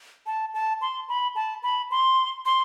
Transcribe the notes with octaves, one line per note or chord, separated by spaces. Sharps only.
A5
A5
C6
B5
A5
B5
C6
C6